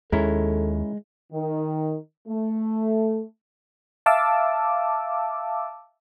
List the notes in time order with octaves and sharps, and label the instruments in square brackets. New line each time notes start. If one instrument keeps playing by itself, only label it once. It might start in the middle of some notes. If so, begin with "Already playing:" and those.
[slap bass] D#2 [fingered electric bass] G#3 [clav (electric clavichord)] C#4 E4 A#4 [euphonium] A4
[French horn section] D#3
A3
[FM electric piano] E5 F5 A5 D6 E6